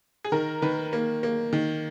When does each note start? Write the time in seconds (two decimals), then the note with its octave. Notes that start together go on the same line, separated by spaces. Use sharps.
0.25 G#4
0.32 D#3 A#4
0.62 D#3 B4
0.93 A#3
1.23 A#3
1.53 D#3